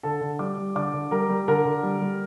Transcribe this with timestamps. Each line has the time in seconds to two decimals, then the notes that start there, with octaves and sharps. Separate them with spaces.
0.03 D3 A4 A5
0.21 D3
0.39 G3 D5 D6
0.58 G3
0.75 D3 D5 D6
0.94 D3
1.11 G3 A#4 A#5
1.29 G3
1.48 D3 A#4 A#5
1.65 D3
1.83 G3
2.02 G3